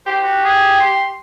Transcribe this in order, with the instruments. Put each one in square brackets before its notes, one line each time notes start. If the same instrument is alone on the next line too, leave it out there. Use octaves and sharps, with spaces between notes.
[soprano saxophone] G4 [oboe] C5
[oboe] F#4
G#4
C6